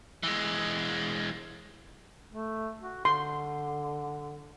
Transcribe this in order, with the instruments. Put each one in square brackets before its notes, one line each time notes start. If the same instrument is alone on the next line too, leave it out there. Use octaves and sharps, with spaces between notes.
[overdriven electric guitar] E3 G#3
[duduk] A3
F#4
[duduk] D3 [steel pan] C6